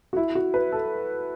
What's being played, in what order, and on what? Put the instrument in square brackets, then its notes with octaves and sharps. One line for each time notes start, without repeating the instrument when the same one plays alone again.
[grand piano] F#4
E4
F#4
B4
A4